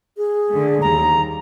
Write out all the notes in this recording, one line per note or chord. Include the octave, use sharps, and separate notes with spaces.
G#4
D3 A3
D#2 G3 A#5